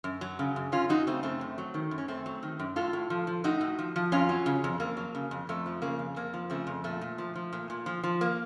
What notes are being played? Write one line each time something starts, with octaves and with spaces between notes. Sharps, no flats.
F#2
F#3
C#3
F#2
F#2 C#4 F4
F#3 D#4 F#4
C#3 A3 C4
F#2 A3 C4
F#2
F#3
D#3
F#2
C#4
F#2 A3 C4
F#3
D#3
F#2
A2 F4 A4
A2
F3
F3
A2 D#4 F#4
A2
F3
F3
F2 C#4 F4
F#3
C#3
F2
F2 A#3
F#3
C#3
F2
F2 A3
F3
C#3 A#3
F2
F2 A#3
F3
C#3 A3 C4
F2
A#2 A3
A#2
F3
F3
A#2
A#2
F3
F3
A#3